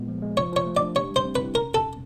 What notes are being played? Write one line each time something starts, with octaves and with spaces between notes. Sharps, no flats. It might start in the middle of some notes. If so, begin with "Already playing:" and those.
Already playing: A#2 G#3 B3
F3
G#3
F3 C#5
F3 C#5
A3
D5
D4
G4 C#5
G3
C5
C4
E4 B4
C#4 A#4
E2 A4
B2